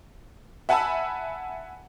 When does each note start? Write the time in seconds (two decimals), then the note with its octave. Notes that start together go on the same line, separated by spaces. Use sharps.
0.69 E5 F#5 G#5 A5 B5 E6